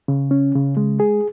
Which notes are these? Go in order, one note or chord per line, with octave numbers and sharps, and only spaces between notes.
C#3
C#4
C#3
G#3
G#4